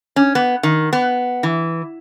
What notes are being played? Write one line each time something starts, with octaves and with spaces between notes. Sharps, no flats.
C#4
B3
D#3
B3
E3